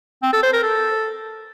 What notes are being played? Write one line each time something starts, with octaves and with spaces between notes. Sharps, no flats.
C4
A4
C5
A#4
A4